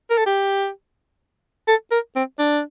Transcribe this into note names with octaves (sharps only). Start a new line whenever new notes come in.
A#4
A4
G4
A4
A#4
C4
D4